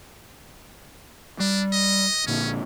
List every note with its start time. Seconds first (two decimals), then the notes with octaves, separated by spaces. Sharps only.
1.40 G3 D4
1.73 D#5
2.27 A#1 A#2 D3 C#4